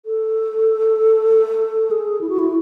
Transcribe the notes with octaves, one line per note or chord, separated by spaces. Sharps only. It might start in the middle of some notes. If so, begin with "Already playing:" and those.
A4
G#4
E4
F#4
E4